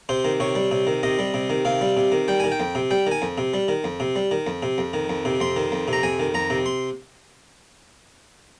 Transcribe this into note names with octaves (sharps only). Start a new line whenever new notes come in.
C3 C5
D#3
C3 C#5
G3
C3
D#3
C3 D#5
G3
C3
D#3
C3 F5
G3
C3
D#3
G3 G5
D#3 G#5
G5
F2
C3
G3 G5
D#3 G#5
F2
C3
G3
D#3
F2
C3
G3
D#3
F2
C3
F2
D#3
F2
C3
F2 C6
D#3
F2
C3
A#5
F2 G#5
D#3
F2 A#5
C3
C6